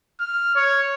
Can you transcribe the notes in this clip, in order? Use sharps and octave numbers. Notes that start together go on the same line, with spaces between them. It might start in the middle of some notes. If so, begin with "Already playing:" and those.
F6
C#5